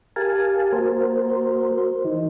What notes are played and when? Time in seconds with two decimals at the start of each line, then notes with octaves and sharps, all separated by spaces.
0.16 G4 A#4 F5 G#5 A5
0.72 A#3 F#4 A#4 C5
1.78 C5
2.05 E3 D#4